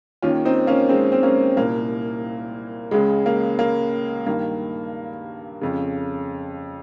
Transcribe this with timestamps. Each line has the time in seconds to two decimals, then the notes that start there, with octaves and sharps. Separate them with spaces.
0.22 D#2 D#3 C#4 F4
0.45 C4 D#4
0.67 A#3 C#4
0.89 G#3 C4
1.12 C4
1.23 A#3 C#4
1.57 C2 A#2 A#3
2.91 C#2 C#3 G#3
3.26 A#3
3.59 A#3
4.26 G2 D#3 A#3
5.61 F2 C#3